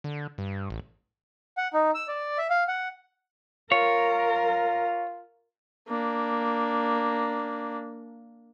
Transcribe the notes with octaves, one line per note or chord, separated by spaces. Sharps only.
D3
G2
A1
F#5
D#4
E6
D5
E5
F5
F#5
F4 A#4 C#5
A#3 D4